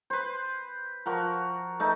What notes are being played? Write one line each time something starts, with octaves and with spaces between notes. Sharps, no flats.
B4 C5
F3 F#4 A#4
A3 D#4 B4